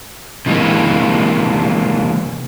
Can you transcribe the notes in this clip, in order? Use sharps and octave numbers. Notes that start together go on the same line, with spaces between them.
C3 E3 G#3 A#3